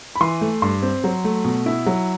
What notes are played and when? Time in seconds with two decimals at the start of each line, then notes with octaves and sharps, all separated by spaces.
0.16 B5
0.21 E3 C6
0.41 A3
0.62 G2 C6
0.83 C4
1.04 F#3
1.24 A3
1.45 B2
1.66 E4
1.86 F#3